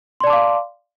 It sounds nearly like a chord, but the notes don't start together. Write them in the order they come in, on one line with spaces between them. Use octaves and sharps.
C6 D5 A5 D6 F5